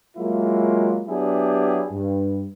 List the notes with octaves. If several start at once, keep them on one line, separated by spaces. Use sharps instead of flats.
F#3 G#3 A#3 E4 F4
F#3 B3 D4 E4 G4 G#4
G2